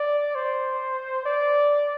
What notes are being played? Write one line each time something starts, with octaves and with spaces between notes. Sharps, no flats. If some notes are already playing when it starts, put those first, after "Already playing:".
Already playing: D5
C5
D5